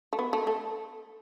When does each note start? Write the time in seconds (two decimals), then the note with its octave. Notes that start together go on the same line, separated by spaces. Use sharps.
0.13 A3
0.19 B3
0.33 A3
0.47 A3